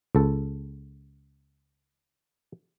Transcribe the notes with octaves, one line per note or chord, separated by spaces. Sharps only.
C#2 A4